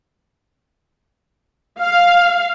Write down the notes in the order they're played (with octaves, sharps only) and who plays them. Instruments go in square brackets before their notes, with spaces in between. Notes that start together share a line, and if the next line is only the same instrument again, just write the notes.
[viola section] F5